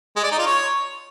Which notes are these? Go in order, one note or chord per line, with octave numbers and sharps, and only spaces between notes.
G#3
D5
D#4
F4
C#5